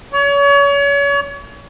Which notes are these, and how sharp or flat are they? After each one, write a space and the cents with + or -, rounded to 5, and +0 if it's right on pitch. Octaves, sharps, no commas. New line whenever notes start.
C#5 +35